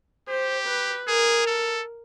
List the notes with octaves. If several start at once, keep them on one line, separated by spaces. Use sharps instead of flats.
G4 C5
B4
G#4 A#4
A4